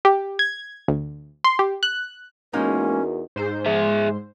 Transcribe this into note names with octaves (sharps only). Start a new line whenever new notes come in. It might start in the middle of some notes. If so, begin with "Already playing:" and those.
G4
G#6
D2
C6
G4
F#6
E2 G#3 A#3 C#4 D#4 F#4 A#4
G#2 C5
G#4 E5